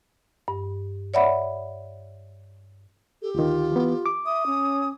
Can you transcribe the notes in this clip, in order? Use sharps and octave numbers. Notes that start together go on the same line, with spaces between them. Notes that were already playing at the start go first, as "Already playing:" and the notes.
G2
C#5 D5 E5 F#5 B5
G4 A4
D2 D#3 F4
E3 B3
D6
E5 D#6
C#4